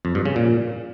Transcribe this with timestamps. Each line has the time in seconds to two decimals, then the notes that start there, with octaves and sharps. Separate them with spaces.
0.05 F2
0.15 G2
0.26 C#3
0.36 A#2